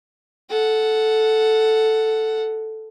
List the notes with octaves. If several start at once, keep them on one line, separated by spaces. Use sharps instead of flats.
A4 F#5